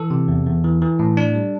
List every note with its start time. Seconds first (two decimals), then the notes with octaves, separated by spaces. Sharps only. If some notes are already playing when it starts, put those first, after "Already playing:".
Already playing: E3 A4
0.10 C3
0.28 E2
0.46 E2
0.64 E3
0.82 E3
0.99 A2
1.17 D4
1.35 G3